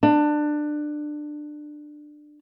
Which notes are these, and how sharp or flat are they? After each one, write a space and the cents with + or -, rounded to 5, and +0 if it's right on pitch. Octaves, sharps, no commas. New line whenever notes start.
D4 +20